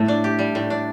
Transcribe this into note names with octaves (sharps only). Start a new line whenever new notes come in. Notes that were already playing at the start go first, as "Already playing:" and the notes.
Already playing: A2 A3 A4
D4
G4
G3
A2
D4